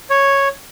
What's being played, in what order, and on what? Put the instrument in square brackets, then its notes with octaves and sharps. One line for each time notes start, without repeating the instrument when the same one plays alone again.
[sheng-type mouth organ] C#5